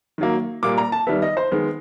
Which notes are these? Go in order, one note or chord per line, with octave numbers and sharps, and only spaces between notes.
D#3 F#3 A#3
A#2 G3 A#3 D6
A#5
A5
D#3 G3 B3 E5
D#5
C5
D#3 G#3 B3